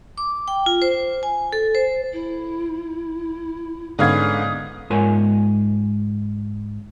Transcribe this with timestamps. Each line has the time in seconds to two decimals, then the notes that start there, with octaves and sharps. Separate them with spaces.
0.18 D6
0.48 G5
0.66 F4
0.82 C5
1.23 G#5
1.53 A4
1.75 C5
2.13 E4
3.99 G#2 D3 B3 C#4 F5 D#6 G#6
4.90 G#2 F4 A#4 C#5 G#5